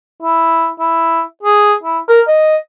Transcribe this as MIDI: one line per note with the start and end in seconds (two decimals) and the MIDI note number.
0.22 0.69 64
0.79 1.22 64
1.43 1.74 68
1.83 1.99 64
2.08 2.21 70
2.27 2.57 75